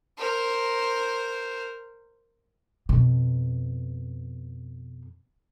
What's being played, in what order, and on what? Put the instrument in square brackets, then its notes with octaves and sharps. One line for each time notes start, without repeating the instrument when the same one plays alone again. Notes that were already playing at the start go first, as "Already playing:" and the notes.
[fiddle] A#4 C5
[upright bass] F2 B2